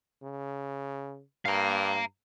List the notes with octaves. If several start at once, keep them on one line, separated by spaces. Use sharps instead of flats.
C#3
G2 F5 A#5